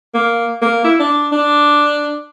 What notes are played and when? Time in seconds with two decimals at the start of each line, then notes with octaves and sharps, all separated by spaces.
0.14 A#3
0.62 A#3
0.84 E4
1.00 D4
1.32 D4